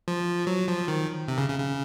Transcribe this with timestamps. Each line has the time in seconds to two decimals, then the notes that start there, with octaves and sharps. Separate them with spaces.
0.08 F3
0.47 F#3
0.67 F3
0.88 D#3
1.28 C3
1.38 C#3
1.49 C#3
1.59 C#3